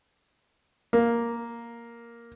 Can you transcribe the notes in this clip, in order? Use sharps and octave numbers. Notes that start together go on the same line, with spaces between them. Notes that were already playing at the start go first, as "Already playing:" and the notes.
A#3